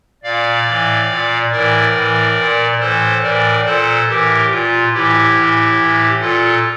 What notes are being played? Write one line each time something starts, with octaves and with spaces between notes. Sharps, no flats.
A#2 D5 F5
A2 E3
A#2
A2 E3 A#4 D5
A2 E3
A#2
A2 E3 A4 C5
A2 E3 A#4 D5
A#2 A4 C5
A2 E3 G4 A#4
A#2 F4
A2 E3 E4 G4
A2 E3
A2 E3
A#2 F4 A4